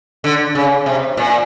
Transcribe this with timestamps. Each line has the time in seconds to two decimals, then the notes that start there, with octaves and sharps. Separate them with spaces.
0.24 D3
0.55 C#3
0.86 C3
1.17 A#2